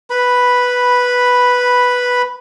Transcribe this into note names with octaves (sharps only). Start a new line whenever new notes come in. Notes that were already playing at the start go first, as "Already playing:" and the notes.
B4 B5